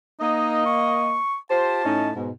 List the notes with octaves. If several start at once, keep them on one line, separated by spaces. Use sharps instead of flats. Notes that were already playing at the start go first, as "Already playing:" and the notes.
A#3 D#4 D#5
C#6
F4 G4 C5 A5
A2 C#4 D#4
G#2 B2